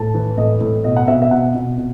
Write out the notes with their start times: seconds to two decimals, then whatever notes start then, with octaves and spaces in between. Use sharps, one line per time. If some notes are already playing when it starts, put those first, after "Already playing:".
Already playing: A2 A5
0.14 E3
0.37 A2 D#5
0.61 A2
0.84 B2 D#5
0.96 F#5
1.08 B2 E5
1.22 E5
1.31 B2 F#5
1.55 B2
1.78 B2